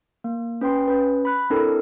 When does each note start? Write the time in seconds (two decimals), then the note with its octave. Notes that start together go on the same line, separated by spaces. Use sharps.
0.24 A#3
0.61 C#4 B4 G5 C6
0.88 C#4 B4
1.25 B5 F#6
1.50 C4 D4 E4 A4 A#4